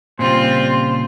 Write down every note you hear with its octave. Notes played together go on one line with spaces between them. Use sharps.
A#2 C#3 G3 C4 F4 C5